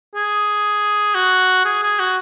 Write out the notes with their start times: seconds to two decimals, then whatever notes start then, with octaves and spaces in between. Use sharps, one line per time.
0.15 G#4
1.15 F#4
1.65 G#4
1.83 G#4
2.00 F#4